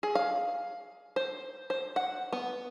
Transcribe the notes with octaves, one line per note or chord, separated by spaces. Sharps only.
G#4
F5
C5
C5
F#5
B3